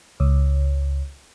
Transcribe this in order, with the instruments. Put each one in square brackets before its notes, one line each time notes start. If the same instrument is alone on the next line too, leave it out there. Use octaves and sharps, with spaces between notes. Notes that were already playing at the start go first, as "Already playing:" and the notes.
[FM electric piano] C#2